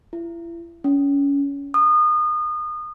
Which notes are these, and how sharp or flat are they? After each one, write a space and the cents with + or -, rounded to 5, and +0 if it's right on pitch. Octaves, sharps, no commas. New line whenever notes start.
E4 +35
C#4 +25
D#6 -30